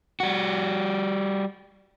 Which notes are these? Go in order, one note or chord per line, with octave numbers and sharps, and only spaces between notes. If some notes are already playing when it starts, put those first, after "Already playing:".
G3 F#4